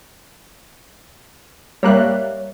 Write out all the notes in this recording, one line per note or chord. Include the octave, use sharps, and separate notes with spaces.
G3 A#3 C#5 E5 F#6